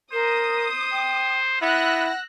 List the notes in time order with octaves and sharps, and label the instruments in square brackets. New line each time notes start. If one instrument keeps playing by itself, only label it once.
[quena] A#4 [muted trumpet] C5 [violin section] D#6
[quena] G5
[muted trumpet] B3 [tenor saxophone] E4 [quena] F#5 [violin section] E6 F#6 A#6